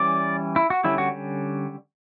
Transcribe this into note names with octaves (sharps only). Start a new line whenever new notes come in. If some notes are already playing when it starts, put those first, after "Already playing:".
Already playing: E3 G3 C#4 D5
E4
F#4
D3 G3 C#4 E4
F#4